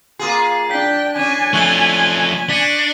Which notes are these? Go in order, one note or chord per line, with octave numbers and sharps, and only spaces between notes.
A#3 F4 G#4
D4 G5 B6
C#4 D4 G#5
F3 A3 C#6 F#6 G7
D4 B6 C#7 D#7